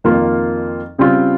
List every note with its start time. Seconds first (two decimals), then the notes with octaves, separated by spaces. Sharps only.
0.04 F2 D#3 A#3 F4
0.98 C#3 G3 C4 F4